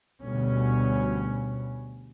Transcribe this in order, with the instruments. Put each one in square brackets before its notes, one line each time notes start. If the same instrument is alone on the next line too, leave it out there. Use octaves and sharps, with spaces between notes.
[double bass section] D2 B2 G3 C#4